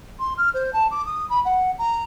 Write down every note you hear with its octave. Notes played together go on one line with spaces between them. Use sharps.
C6
F6
C5
A5
D6
D#6
B5
F#5
A#5